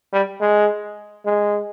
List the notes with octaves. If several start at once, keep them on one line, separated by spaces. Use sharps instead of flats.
G3
G#3
G#3